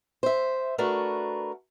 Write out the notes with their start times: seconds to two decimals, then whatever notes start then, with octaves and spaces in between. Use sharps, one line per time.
0.23 C5 E5
0.78 A3 D4 F#4 A#4 B4